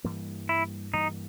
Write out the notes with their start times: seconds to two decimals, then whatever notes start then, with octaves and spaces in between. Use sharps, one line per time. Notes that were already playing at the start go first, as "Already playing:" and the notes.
0.04 G2 E3 G3 A#3
0.49 E4
0.93 G2 E3 G3 A#3 D#4